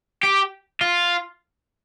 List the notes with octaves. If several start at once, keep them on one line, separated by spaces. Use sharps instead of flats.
G4
F4